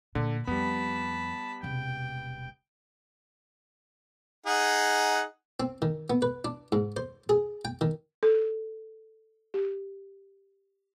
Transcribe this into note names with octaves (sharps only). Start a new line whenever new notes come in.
A#2 D3
F2 G3 B3 A5 B5
E1 C3 G5
D#4 G#4 F#5
C4
D#3
B3
B4
D4
G#2
C5
G#4
G5
D#3
A4
G4